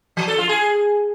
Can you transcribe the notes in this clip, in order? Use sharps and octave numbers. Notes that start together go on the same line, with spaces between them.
F3
A4
F4
G#4